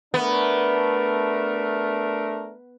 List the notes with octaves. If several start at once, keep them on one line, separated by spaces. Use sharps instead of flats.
A3 B3 D4 A#4